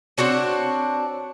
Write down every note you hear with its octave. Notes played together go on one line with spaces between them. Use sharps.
C4 D4 F#4 C#5